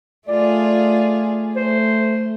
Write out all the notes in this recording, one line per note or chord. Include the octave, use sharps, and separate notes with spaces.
A3 F4 G#4 D5
A3 C5